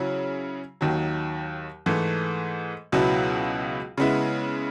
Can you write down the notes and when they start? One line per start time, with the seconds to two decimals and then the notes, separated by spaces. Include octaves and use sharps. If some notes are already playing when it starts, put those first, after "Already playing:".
Already playing: C#3 F#3 C#4 E4
0.81 D#2 D#3 F#3
1.86 G#2 E3 A3
2.92 C#2 B2 F#3 B3 E4
3.98 C#3 G#3 B3 E4